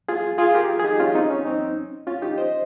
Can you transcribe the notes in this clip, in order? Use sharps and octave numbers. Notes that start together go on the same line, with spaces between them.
F4 G#4
F4 G#4
G4 A#4
F4 G#4
G#4
D#4 G4
C#4 F4
C4 D#4
C#4
C4 D#4
C#4 F4
D#4 G4
C5 D#5